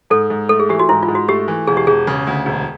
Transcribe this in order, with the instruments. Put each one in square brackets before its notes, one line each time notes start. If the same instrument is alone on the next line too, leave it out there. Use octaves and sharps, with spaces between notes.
[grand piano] G#2 [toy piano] A4
[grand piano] G#2
[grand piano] A3 [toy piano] A4
[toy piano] G#4
[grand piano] E3 [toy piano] G4
[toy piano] F#4
[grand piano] G#2 [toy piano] E4
[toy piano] F4
[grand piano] G#2
[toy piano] F#4
[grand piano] A3 [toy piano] G4
[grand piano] E3
[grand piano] E1 [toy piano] G#4
[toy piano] G4
[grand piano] E1 [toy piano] G#4
[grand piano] C#3
D2
E1